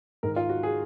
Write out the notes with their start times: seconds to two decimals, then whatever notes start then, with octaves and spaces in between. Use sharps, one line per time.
0.23 G#2 D#3 A#4
0.36 F4
0.49 F#4
0.63 G#4